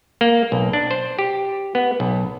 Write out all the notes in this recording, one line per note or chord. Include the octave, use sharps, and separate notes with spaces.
A#3
B1
D4
C5
G4
B3
B1